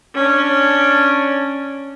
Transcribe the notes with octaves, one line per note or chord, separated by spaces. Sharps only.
C#4 D4